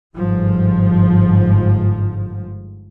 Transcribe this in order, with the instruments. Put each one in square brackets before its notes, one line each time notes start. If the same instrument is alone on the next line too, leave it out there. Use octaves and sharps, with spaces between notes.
[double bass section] G1 G#2 F3